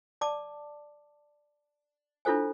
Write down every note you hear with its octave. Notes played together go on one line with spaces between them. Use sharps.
D5 A5 D6
D4 E4 F4 A4 C5 G#5